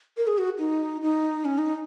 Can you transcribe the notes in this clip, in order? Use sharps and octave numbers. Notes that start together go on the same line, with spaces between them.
A#4
G#4
F#4
D#4
D#4
C#4
D#4